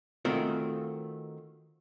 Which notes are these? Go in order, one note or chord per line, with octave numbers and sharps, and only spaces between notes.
D#3 A3 C4 F4 F#4 A#4